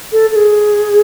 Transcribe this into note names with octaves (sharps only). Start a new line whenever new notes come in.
A4
A4
G#4